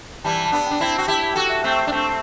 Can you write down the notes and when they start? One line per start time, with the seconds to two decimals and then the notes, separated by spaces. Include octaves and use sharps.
0.24 E3 G3 A5
0.46 A5
0.52 B3 D4
0.66 G5
0.71 D4
0.80 C4 E4
0.87 A5
0.98 F#4
1.08 E4 G4 A5
1.30 G5
1.35 F#4 A4
1.49 E5
1.64 A3 C4
1.71 G5
1.87 D4
1.92 A3 C4 A5